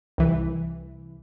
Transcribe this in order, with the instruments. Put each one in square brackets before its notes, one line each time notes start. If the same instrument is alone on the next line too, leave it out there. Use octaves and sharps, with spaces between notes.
[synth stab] C2 E3